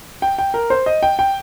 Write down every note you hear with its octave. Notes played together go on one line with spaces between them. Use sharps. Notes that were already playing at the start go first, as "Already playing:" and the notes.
G5
G5
A#4
C5
D#5
G5
G5